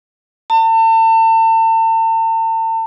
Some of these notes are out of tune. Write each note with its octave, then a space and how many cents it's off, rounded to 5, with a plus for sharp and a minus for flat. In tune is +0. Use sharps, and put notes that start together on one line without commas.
A5 +40